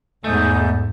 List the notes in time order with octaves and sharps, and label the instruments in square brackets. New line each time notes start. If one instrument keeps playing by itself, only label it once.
[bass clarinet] E2 [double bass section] G#2 [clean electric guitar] A3 [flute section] D#4 G#5 G6